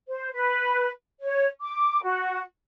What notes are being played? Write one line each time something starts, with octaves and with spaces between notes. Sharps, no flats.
C5
B4
C#5
D6
F#4